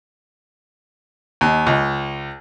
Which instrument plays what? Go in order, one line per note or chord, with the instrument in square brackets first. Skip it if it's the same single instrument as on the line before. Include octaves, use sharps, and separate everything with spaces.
[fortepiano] D#2
C#2